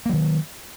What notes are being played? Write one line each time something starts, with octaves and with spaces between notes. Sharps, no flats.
D#3 F#3 A#3